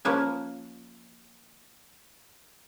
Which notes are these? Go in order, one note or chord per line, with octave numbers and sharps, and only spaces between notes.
F3 A#3 C#4 B4 G#5